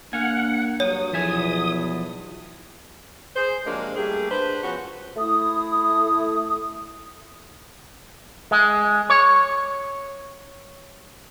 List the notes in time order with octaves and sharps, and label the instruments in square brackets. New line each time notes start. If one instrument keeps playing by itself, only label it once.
[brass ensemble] A#3 D4 A#4 [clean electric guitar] F5 G#5 [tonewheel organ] F#5
[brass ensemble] G2 F#3 [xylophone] C#5 [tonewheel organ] D#6
[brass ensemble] B1 E2 [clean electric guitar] F3 E5 G#5
[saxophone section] G#4 C5
C3 F3 F#3 G#3 A#3 D4
G3 A3 A#3 G4 G#4
D4 B4 C5
F3 B3 C#4 F#4
[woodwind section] A3 E4 D#6
[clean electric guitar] G#3
C#5